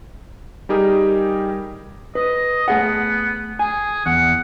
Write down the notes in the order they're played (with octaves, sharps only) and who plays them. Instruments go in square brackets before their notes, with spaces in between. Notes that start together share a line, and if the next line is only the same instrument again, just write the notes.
[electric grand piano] G3 D#4 G4 G#4 A#4
[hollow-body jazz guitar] B4 [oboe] D#5
[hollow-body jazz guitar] A3 G#4 F#5 [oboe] B3
[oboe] G#4 [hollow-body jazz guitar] G#5
[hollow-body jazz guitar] E2 [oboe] F#5